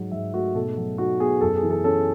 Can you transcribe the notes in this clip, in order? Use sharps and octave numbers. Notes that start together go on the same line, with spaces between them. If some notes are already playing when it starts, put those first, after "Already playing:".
Already playing: G#2 F#3
G#2 E5
A3 F#4
B2 A4
F#3
D#4 F#4
B3 G#4
F#2 A4
G#4
E3
A4
C#4 A4